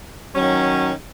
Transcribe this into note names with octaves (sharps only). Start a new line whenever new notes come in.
D#3 F#3 C#4